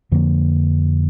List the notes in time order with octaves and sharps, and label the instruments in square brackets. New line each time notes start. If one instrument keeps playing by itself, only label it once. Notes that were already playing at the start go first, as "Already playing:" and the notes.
[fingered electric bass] F2 D3 F3 A#3